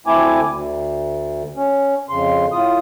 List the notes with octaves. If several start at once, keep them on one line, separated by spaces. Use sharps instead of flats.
D2 A3 C4 E4 G#5 D6
D2
C#4
F2 C#3 C6
A2 F4 D#6